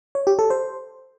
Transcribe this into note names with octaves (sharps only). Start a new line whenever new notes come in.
C#5
G4
A4
C5